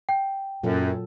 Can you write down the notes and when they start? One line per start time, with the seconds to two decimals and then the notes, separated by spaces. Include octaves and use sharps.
0.09 G5
0.63 F#2 A#2 F#3 A4